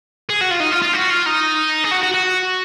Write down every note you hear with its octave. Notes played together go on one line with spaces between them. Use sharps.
G#4
F#4
F4
D#4
F4
F4
F#4
F4
D#4
G#4
F#4
F#4
F#4